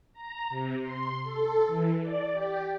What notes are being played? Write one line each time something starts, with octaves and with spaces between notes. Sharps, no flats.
A#5
C3
C6
A4
E3
D5
G4